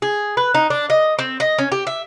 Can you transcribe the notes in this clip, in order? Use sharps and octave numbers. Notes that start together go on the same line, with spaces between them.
G#4
B4
D#4
D4
D#5
C4
D#5
C#4
G4
E5